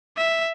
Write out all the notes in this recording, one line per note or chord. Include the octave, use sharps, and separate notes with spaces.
E5